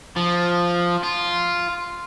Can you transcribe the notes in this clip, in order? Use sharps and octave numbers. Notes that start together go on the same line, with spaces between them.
F3
F4